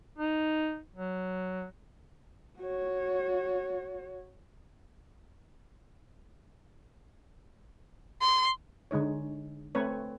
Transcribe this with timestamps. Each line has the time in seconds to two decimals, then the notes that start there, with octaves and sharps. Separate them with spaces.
0.19 D#4
0.95 F#3
2.58 F#4 C#5
8.21 C6
8.91 D3 G#3 D#4 C#5
9.75 A3 C4 B4 C#5